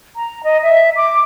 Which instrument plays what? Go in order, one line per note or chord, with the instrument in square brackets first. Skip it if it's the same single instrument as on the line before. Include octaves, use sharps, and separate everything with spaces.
[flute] A#5
D#5
E5
D6